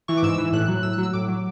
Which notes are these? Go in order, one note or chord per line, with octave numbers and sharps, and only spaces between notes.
E3 C#6
D6
G#2 E6
E3
A2 F#6
F#3
A2 E6
F#6
F#3 E6
A2 D6
F#3